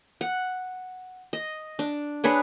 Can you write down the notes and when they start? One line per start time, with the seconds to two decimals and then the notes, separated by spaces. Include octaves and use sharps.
0.21 F#5
1.33 D#5
1.79 D4
2.24 D4 G#4 B4 C#5